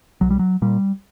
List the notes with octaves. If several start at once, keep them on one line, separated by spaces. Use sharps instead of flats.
B1 F#3
G3
F#3
A#2 G3